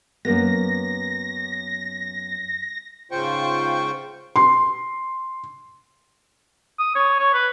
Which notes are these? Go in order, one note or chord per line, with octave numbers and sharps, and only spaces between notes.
F#2 A#3 B3 A#6
G#2 C#3 F4 C5 G5 C#6
C6
D#6
C#5
C#5
B4